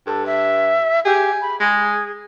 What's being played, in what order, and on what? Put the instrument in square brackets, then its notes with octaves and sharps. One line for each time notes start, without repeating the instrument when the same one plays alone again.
[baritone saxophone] G2 [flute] A4
[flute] E5
[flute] G4 [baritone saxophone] G#4
[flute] B5
[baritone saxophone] G#3 [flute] G#4